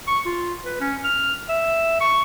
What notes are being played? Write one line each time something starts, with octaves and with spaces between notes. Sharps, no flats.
C#6
F4
B4
C#4
F6
E5
C#6